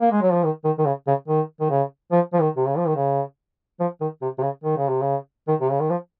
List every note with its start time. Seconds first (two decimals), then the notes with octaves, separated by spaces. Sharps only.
0.01 A#3
0.12 G#3
0.22 F#3
0.33 F3
0.44 D#3
0.65 D#3
0.79 D#3
0.86 C#3
1.07 C#3
1.28 D#3
1.60 D#3
1.70 C#3
2.11 F3
2.33 F3
2.40 D#3
2.56 C3
2.68 C#3
2.78 F3
2.87 D#3
2.96 C#3
3.80 F3
4.01 D#3
4.22 C3
4.38 C3
4.43 C#3
4.64 D#3
4.77 C#3
4.89 C3
5.02 C#3
5.48 D#3
5.61 C3
5.71 C#3
5.80 D#3
5.90 F3